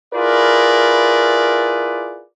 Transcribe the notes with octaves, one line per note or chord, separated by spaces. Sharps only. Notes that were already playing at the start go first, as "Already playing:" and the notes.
E4 F4 G#4 A#4 B4 D5